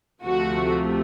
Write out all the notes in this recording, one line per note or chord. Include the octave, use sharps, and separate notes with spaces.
D2 C3 F3 A3 F#4